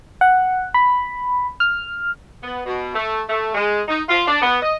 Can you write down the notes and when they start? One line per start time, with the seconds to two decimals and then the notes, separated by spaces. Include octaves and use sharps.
0.21 F#5
0.74 B5
1.60 F6
2.43 B3
2.66 B2
2.94 A3
3.29 A3
3.55 G#3
3.88 D#4
4.08 F4
4.28 D4
4.42 B3
4.61 D#5